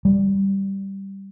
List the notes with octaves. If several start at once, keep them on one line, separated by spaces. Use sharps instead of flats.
G3